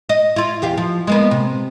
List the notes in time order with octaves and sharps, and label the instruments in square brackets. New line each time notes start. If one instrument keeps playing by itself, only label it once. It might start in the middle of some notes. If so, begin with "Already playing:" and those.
[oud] D#5
E4 F4
E2 G4 F5
F3
G#3 A#3 B3
C3